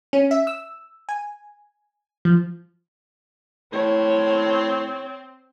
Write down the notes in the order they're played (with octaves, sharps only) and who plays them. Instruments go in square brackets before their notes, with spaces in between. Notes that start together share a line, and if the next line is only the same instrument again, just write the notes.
[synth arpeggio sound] C#4
E5
E6
G#5
F3
[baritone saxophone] A2 [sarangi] C4 [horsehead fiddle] C#5